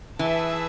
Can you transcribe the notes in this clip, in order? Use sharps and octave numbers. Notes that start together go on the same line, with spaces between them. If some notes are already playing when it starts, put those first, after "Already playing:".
E3 G#4 B4 E5 A5